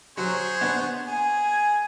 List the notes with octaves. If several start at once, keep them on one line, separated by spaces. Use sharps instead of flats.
F#3 G#4 C5 C#5
B3 D4
G#4 G#5